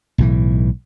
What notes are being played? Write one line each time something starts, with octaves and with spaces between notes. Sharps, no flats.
B1 A2 E3